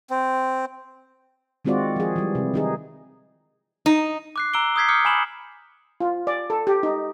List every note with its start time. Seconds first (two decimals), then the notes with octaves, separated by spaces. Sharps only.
0.10 C4
1.65 D#3 G#3 C4 F4 F#4 D5
1.96 F3 G#4
2.16 E3 G3
2.35 C3
2.54 D#3 D#4 G#4
3.86 D#4
4.36 D6 F#6 C7
4.54 A#5 E6 D7 G7
4.76 D#6 E6 G6 G#6 B6 C7
4.88 D6 D#6 F6 G6 C#7
5.05 G#5 B5 E7 F#7
6.00 F4
6.27 D5
6.50 A4
6.67 G4
6.83 D#4